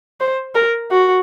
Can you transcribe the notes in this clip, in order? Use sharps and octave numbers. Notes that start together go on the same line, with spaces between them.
C5
A#4
F#4